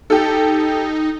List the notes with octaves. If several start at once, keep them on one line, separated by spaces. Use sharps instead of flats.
D#4 G4 A4